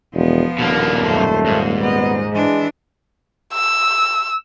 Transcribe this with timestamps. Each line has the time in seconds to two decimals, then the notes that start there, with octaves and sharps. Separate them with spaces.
0.14 E1 F3 B3
0.59 D#1 B2 D3 A#3
1.02 F#2 A3 C5
1.46 G#2 A#3
1.80 B3 D#5
2.33 E3 G#3 D4
3.54 E6